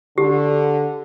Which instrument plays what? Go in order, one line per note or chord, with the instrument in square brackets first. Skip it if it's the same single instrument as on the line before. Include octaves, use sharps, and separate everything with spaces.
[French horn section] D3 [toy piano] G4